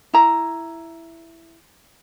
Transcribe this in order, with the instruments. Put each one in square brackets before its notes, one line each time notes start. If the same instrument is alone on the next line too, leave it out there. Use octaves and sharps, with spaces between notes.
[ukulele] E4 A#5